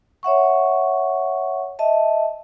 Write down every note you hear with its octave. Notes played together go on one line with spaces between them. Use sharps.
C#5 E5 F#5 C#6
D#5 E5 A5